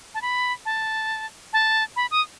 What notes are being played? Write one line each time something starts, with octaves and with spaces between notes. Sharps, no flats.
A5
B5
A5
A5
B5
D#6